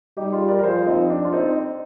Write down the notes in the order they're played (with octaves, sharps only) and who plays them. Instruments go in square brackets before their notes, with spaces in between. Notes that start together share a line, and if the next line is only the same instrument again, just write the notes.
[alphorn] G3 [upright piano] D#4 G4
[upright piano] F4 G#4
A#4 D5
A#4
[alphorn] F3 [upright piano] G#4 C5
[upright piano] C4 D#4
D4
F4
C4 D#4